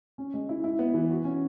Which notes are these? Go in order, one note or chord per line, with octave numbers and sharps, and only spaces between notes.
C#4
G#3
E4
E4
B3
E3
F#4
C#4